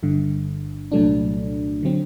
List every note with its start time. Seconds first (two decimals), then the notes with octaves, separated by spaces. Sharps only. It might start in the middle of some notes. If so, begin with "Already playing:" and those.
0.03 G1 G2 D3
0.92 C2 A#2 F#3 A3 D4
1.83 D3 F#3 C4